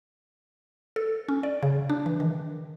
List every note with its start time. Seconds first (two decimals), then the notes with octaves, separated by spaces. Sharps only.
0.96 A4
1.28 C#4
1.43 D5
1.63 C#3
1.90 D4
2.06 E3
2.20 D#3